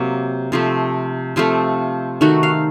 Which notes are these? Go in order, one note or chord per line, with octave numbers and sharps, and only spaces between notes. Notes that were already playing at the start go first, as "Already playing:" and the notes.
Already playing: C3 F#3 A#3
C3 F3 A3
C3 F3 A3 F4
D#3 A3 F#4
F5